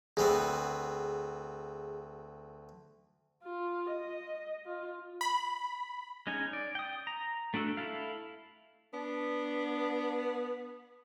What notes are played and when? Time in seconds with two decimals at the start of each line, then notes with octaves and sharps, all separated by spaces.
0.17 D2 B3 C4 G#4
3.43 F4
3.90 D#5
4.65 F4
5.21 B5
6.27 G#3 C#4 D#4 G#5
6.53 D5
6.75 G5 D#6
7.07 A#5
7.54 A3 D4 F#4 A4
7.77 E4 A4 F5
8.93 B3 D4